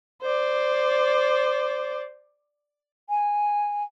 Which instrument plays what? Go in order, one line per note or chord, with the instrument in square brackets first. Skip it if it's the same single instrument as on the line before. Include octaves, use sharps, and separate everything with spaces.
[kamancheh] C5 D5
[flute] G#5